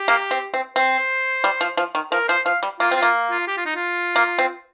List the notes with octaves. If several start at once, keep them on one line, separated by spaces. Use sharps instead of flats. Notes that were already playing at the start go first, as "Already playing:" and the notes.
Already playing: G4
A#3
C4
C4
C4 C5
G3
F3
F3
D#3
F3 A#4
F3 C5
F3 F5
G3
A#3 F4
C4
F4
A#3
F4
G4
F4
D#4
F4
A#3
C4